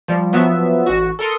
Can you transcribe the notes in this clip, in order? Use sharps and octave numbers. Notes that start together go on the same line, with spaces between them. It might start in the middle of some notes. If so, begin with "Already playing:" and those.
F3 G3
F3 F#3 B3 E5
A1 F#4
A4 A#4 C6 D#6